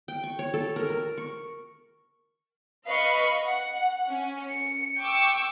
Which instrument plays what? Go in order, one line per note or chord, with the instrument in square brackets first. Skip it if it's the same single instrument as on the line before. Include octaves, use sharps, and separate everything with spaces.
[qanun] G5
C#6
C#5
A4
A#4
A#4
C#6
[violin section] B4 D#5 F5 B5 C#6
F#5
C#4
C#7
G5 C#6 D6 E6